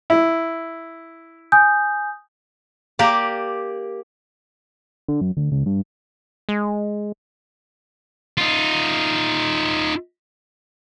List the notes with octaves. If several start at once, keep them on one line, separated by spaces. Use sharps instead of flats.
E4
G#5 D#6 G6
A#3 G4 A#4 D5
D3
F#2
D2
C#2
G2
G#3
D#4 F4